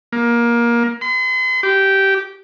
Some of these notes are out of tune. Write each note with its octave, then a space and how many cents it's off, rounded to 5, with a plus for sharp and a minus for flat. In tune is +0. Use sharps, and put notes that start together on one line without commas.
A#3 +20
C6 -45
G4 -15